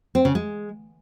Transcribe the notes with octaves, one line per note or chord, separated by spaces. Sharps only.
C4
C#3
G#3